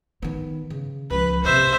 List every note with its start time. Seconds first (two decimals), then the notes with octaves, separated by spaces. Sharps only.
0.22 D#3 B3
0.70 C#3
1.10 C#2 F3 B4
1.44 C3 A#3 C5 E5